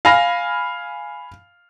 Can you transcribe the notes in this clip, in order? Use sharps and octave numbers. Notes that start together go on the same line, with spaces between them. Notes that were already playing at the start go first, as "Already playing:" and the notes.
F5 G#5 B5 F6 A#6